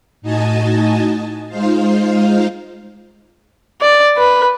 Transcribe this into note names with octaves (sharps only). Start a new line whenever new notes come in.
A2 D#4 F#4 D#5 G#5 A5
G#3 D#4 F4 C5 F5
D5
B4